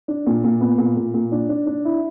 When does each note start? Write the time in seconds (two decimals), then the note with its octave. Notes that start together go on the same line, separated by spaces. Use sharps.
0.08 D4
0.27 A#2
0.44 A#2
0.61 B3
0.78 A#2
0.97 A#2
1.14 A#2
1.32 D4
1.49 D4
1.66 D4
1.85 E4